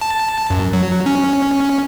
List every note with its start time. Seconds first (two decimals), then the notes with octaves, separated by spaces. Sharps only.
0.01 A5
0.50 F#2
0.73 F#3
1.06 C#4